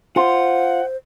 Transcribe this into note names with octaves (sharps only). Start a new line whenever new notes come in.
F4 C5 F#5